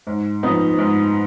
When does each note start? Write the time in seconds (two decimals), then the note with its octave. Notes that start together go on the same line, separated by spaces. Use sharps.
0.07 G#2
0.43 F3 B3 D#4
0.78 G#2